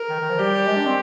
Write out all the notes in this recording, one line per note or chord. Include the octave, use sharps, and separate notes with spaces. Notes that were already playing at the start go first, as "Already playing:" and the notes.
Already playing: A#4
D#3
D#3
F3
G3 G4
G#3
D4
C4